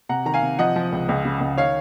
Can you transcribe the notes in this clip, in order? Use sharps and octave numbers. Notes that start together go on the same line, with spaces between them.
C3 F#5 A#5
D#3 A#5
F5 G#5
C3
F3 D#5 F#5
F3
C#2
C#2
C#3
C#2
D#3 C#5 F5